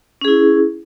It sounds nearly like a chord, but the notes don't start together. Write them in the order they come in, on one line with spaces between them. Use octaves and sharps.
C#4 G#4 E4